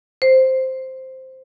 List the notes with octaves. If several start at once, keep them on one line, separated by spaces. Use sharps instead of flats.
C5